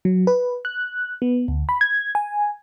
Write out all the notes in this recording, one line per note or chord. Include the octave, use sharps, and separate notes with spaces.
F#3
B4
F#6
B3
D2
B5
G#6
G#5